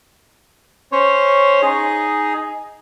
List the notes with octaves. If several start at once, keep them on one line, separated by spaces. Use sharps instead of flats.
C#4 C5 C#5
D#4 G#4